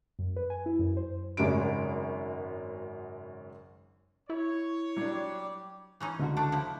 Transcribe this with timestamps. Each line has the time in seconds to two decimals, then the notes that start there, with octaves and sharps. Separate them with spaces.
0.19 F#2
0.36 B4
0.50 G#5
0.66 E4
0.79 F#2
0.97 C5
1.37 G#1 F#2 C#3 G#3 F#4 D7
4.30 E4 C#5
4.97 F#3 G3 D4 G4
6.00 E3 C#4 D#4
6.19 C#2 D3 F#4
6.37 A3 D4 A4
6.52 F3 E4